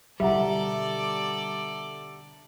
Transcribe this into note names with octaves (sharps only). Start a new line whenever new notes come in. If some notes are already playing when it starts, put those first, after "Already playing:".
B2 D3 G3 A4 D5 E5 F#5 A#5